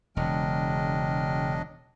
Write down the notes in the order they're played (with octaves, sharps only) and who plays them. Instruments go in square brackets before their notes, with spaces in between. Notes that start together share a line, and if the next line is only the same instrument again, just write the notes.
[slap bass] E1 [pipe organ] C#3 G5 F6 [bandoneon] F#3 D4 D#5